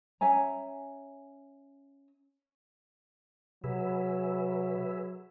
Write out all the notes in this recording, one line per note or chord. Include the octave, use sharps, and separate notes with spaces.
C#4 E5 G#5 A#5
C3 F#3 G#4 B4 E5